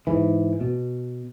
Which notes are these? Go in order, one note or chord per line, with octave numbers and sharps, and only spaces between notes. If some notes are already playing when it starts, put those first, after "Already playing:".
G#2 E3
B2